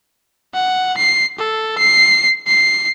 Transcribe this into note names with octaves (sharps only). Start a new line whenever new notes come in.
F#5
C7
A4
C7
C7